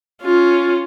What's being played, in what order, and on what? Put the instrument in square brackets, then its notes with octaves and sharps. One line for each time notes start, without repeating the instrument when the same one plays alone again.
[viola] C#4 F4